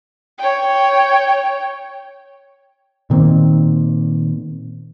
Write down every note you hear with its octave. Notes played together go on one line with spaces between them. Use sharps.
C#5 G5
A#2 D#3 A#3 C4